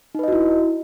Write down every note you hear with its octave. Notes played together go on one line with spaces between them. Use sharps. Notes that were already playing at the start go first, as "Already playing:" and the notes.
D#4 E4 F#4 B4 D#5